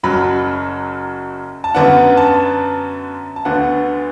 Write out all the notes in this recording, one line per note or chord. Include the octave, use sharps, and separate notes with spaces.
F#1 F#2 F#3 B5
A5
F#2 D3 B3 D4 F#5
A5
A5
D2 D3 B3 F#5